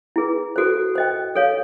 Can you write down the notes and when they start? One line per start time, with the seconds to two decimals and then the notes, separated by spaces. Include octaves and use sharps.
0.16 E4 G#4 B4
0.56 F#4 A4 C5
0.95 C5 D#5 G5
1.36 A4 C#5 F5